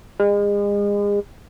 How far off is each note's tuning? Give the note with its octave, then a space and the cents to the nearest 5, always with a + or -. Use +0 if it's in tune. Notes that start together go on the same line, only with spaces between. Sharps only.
G#3 -35